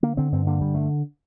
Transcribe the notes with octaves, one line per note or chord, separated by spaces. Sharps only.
D3 A#3
D3 C4
G2 C4
D3 A#3
G2 G3
D3 A3